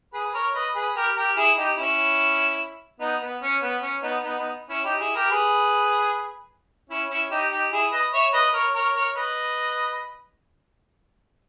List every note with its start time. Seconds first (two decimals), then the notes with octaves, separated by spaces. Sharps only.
0.13 G#4 B4
0.26 B4
0.34 A#4 C#5
0.54 B4 D#5
0.75 G#4 B4
0.96 G4 A#4
1.16 G4 A#4
1.36 E4 G#4
1.57 D#4 G4
1.77 C#4 E4
3.00 B3 D#4
3.22 B3
3.42 C#4
3.62 B3
3.82 C#4
4.02 B3 D#4
4.23 B3 D#4
4.39 B3 D#4
4.69 C#4 E4
4.84 D#4 G4
5.00 E4 G#4
5.15 G4 A#4
5.31 G#4 B4
6.89 C#4 E4
7.10 C#4 E4
7.31 D#4 G4
7.51 D#4 G4
7.72 E4 G#4
7.92 B4 D#5
8.13 C#5 E5
8.33 B4 D#5
8.53 A#4 C#5
8.74 A#4 C#5
8.95 A#4 C#5
9.15 B4 D#5